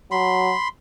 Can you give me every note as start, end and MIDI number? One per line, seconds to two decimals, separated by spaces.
0.11 0.53 54
0.11 0.68 83
0.11 0.68 84